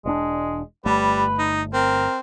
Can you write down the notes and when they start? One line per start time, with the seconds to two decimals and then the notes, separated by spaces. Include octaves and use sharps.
0.05 E1 G#3 C4 D4
0.86 G1 G3 A3 B4
1.39 D#4
1.73 C4 A#4